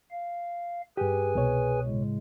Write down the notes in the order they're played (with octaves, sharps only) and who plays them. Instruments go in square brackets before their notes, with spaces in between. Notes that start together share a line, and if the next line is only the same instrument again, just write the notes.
[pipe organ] F5
[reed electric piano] G2 G4 [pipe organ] G#4 B4 G#5
[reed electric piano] C2 B2 C#5
[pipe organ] A2 C#3 G#3